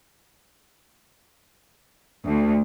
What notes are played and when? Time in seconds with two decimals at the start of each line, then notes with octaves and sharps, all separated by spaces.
2.26 D2